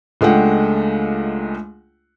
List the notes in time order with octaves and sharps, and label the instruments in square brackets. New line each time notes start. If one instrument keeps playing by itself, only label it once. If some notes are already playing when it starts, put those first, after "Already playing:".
[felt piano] C#2 G#3 A3 D4 F#5 G5